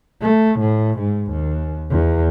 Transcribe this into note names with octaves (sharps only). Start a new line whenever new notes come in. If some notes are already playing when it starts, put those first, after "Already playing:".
A3
A2
G#2
D#2
E2